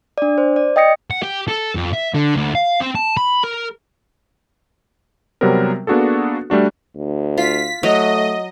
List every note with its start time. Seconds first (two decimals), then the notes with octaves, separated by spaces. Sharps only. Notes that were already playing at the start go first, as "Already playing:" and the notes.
0.18 D4 D5
0.38 C5
0.56 D5
0.76 D#5 G5 D#6 A#6 C#7
1.10 F#5
1.23 G4
1.48 A4
1.75 F2
1.93 E5
2.14 D3
2.35 D2
2.55 F5
2.80 C4
2.95 A5
3.17 B5
3.44 A#4
5.41 C3 F#3 G3 B3 C4 A#4
5.87 A#3 B3 D4 F#4 G#4 A4
6.50 G3 A3 D4 F#4
6.96 D2
7.38 F4 B6
7.83 F#3 A3 D#5